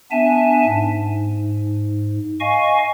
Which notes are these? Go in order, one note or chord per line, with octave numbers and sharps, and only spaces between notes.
B3 D4 E5 G#5 A5
G#2
D#5 F5 G#5 C#6